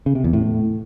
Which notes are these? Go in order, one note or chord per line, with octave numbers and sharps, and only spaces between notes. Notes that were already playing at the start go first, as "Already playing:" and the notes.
C#3
C3
E2
A2